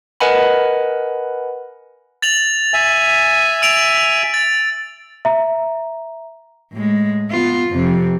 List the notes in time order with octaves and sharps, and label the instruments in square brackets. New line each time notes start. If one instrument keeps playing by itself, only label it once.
[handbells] A#4 B4 D#5 F#5 G#5 B5
[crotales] A6 F7 F#7
[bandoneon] E5 G#5
[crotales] E6 D7 F7
A6
[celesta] E5 A#5
[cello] A2 G#3
B3 F4
F2 C3